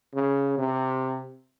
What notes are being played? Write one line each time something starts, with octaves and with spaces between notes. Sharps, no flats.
C#3
C3